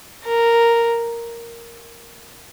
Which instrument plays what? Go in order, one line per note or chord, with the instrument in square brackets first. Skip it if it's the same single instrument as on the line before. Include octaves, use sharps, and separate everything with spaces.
[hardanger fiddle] A#4